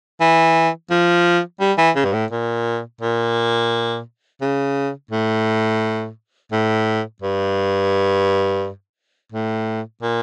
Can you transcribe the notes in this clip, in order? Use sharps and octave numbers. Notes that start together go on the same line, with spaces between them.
E3
F3
G3
E3
C#3
G2
A2
A#2
A#2
C#3
A2
A2
G2
A2
A#2